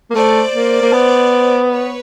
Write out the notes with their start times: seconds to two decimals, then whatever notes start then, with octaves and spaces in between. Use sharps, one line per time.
0.11 A#3
0.14 A3 C5 D5
0.54 A#3
0.82 A#3
0.93 B3
1.70 B4 C#5